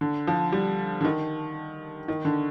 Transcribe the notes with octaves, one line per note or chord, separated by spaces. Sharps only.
D3
F3
G3
D3
D#3
D#3
D3